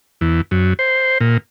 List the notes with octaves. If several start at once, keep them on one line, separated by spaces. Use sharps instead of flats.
E2
F#2
C5
A#2